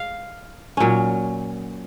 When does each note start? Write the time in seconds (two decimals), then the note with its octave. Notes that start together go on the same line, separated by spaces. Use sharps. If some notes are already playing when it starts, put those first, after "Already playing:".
Already playing: F5
0.77 A#2 F#3 C#4